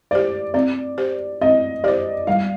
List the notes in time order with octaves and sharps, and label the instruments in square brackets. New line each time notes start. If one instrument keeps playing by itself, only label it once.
[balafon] G4 C5 [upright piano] D5
[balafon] C4 [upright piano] D5
[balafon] G4 C5
[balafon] C4 [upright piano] D#5
[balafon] G4 C5 [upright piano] D5
[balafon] G3 [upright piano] F5